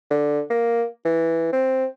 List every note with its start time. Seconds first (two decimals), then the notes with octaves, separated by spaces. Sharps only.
0.10 D3
0.50 A#3
1.05 E3
1.52 C4